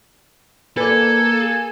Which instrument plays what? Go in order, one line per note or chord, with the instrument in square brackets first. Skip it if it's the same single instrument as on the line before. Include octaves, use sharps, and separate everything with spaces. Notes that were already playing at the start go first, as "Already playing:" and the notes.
[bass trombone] A#3 [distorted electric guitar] A4 [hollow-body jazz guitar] B4 D5 [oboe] G#5